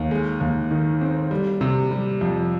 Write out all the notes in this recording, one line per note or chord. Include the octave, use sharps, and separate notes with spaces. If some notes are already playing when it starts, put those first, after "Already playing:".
Already playing: D#2
G#3
D#2
D#3
C4
G3
C3
G3
F2